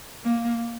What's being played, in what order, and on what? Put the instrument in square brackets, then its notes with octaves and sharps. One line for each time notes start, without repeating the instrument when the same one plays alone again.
[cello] A#3